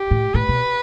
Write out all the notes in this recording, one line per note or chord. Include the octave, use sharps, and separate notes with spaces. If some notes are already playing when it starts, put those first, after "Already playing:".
Already playing: G4
A2
A2 B4
B2